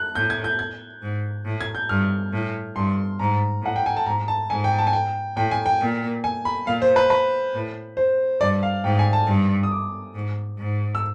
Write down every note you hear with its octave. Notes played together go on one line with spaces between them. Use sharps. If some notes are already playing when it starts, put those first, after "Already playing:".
Already playing: F#6
A2 G6
G#6
G6
G#6
G#2
A2
G#6
G6
G2 F6
A2
G2 C6
G#2 A#5
A2 F#5
G5
G#5
A5
G#2 A#5
A5
G#2 G#5
G5
A5
G#5
G5
A2 G5
G#5
G5
A#2
G#5
B5
A#2 F5
C5
B4
B4
A2
C5
G2 D5
F5
G#2 G5
G#5
A5
G2
D#6
D6
G#2
G#2
E6